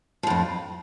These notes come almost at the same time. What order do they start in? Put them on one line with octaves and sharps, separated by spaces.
F3 A2 F2